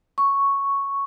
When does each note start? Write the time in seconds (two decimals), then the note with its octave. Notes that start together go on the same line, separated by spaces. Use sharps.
0.18 C#6